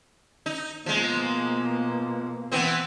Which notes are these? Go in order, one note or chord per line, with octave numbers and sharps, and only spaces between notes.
D#4
B2 F3 G#3 A#3
E3 B3 C4